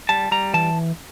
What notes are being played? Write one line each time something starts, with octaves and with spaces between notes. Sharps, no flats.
G3 A5
G3 A#5
E3 A5